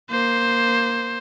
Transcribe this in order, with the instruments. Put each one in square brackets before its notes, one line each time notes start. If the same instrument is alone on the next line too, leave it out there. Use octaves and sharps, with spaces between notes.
[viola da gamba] A#3 [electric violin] C5